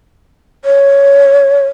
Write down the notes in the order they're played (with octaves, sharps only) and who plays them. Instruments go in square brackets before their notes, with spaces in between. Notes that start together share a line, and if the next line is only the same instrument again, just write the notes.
[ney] C#5